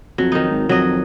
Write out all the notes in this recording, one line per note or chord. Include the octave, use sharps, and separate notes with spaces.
F2 F#3
D#3 D#4
G#1
F2 F#3 D#5